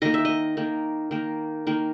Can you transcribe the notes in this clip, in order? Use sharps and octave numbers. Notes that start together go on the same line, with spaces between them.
D#3 A#3 D#5
E5
D#5
D#3 A#3
D#3 A#3
D#3 A#3